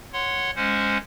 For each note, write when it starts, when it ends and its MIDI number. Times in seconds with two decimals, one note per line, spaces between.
0.13 0.51 73
0.13 0.51 78
0.13 0.51 84
0.56 0.98 56
0.56 0.98 61
0.56 0.98 72
0.56 0.98 78